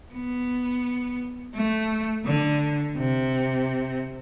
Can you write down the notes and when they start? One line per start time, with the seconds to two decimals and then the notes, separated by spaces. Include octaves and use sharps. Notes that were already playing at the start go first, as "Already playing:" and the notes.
0.13 B3
1.55 A3
2.26 D3
2.96 C3